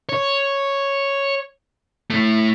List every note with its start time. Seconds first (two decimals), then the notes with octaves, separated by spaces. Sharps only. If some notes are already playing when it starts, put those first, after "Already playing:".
0.09 C#5
2.10 A2 A3